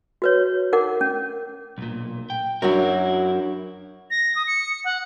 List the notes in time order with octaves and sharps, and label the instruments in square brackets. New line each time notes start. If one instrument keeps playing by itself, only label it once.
[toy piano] F#4 B4 C#5
D#4 A#4 F#5 D6
C#4
[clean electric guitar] B1 A#2
G5
[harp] F#2 F#3 [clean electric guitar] D4 E4 A#4
[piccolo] A#6
D#6
C#7
F#5